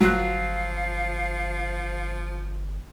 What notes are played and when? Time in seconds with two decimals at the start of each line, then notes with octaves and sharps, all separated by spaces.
0.01 G1 F3 F#3 F4 F5 F#6